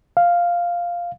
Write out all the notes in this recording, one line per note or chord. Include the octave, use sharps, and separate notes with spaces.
F5